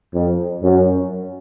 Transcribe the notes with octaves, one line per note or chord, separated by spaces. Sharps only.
F2
F#2